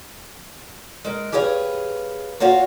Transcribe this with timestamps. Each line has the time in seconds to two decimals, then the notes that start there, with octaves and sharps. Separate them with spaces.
1.05 G#3 A#4
1.32 G4 G#4 B4 C#5 F5
2.40 F4 F#4 C#5 F5 F#5